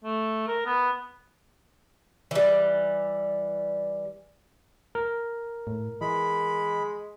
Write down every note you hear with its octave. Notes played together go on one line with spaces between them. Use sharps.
A3
A#4
B3
E3 G3
A#4
A2
E3 G#3 B5